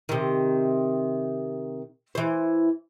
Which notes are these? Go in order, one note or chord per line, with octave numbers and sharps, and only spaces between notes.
C3 D#3
E3 C5